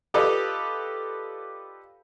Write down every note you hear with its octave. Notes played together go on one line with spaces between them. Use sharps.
F4 G4 A4 B4 D5 D#5